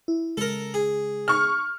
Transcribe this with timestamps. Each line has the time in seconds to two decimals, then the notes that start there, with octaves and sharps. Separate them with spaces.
0.08 E4
0.37 C#3 G#3 A4 A#4
0.74 G#4
1.28 C#6 F6